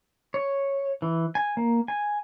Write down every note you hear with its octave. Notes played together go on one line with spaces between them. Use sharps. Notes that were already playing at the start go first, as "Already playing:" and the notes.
C#5
E3
G#5
A#3
G#5